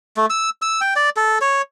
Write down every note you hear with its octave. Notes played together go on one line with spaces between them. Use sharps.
A3
E6
E6
G5
D5
A4
C#5